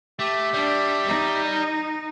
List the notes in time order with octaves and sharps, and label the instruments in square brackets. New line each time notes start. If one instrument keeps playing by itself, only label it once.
[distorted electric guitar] A3 [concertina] G4 E5
[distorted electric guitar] G3 [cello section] D4
[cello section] D#4